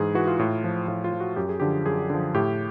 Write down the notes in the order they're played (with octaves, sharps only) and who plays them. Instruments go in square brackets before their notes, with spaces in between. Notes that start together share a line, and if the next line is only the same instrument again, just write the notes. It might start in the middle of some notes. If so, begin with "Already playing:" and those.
Already playing: [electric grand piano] G#2 E3 G#4
E3 F#4
F4
A2
F3
A2 F4
F4
F3
F#4
F#2 G4
G#4
D3 F3 G4
F#2 G#4
D3 F3
A2 G4